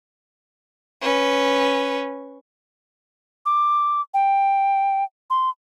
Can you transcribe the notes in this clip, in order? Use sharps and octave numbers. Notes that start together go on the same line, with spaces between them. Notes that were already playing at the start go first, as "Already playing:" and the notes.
C#4 B4
D6
G5
C6